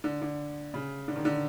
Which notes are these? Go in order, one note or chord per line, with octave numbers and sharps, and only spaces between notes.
D3
D3
C#3
D3
D#3
D3